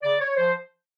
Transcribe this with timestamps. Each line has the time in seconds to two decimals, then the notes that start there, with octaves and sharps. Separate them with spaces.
0.03 C#3 D5
0.20 C#5
0.37 F3 C5